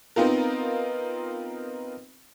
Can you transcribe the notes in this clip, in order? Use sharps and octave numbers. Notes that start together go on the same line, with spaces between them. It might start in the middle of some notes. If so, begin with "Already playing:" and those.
B3 C4 D#4 F4 A#4